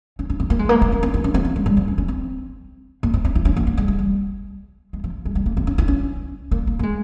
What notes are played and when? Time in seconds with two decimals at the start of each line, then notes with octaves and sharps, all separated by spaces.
0.19 C#4
0.30 C#4
0.40 C4
0.50 A#3
0.59 G#3
0.69 A#3
0.82 A#3
0.92 C4
1.03 C4
1.14 E4
1.24 C#4
1.34 C4
1.45 C4
1.56 G#3
1.66 G3
1.77 F3
1.88 C#4
1.98 C#4
2.08 C4
3.03 A#3
3.14 C4
3.25 C4
3.35 E4
3.45 C#4
3.57 A#3
3.67 A#3
3.77 G#3
3.88 G#3
3.99 G3
4.93 G#3
5.04 F3
5.25 G#3
5.35 G3
5.46 A#3
5.57 C4
5.67 C#4
5.78 E4
5.88 C#4
6.51 A#3
6.67 A#3
6.79 A#3
6.83 G#3